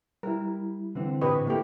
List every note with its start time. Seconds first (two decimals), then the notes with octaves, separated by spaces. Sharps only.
0.23 G3 E4 A#4
0.95 D3 E3 C4
1.21 A2 G4 B4 D#5 C#6
1.47 A#3 E4 G4 A4 E5